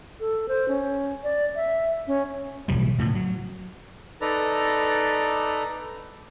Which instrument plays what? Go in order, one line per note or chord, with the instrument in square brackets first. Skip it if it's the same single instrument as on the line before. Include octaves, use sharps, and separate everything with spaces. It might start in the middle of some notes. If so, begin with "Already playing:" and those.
[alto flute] A4
C5
C#4
D5
E5
C#4
[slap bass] D1 B1 E3 G3
A2 C#3 F3
F#3
[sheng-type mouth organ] D#4 A4 B4 D5 A#5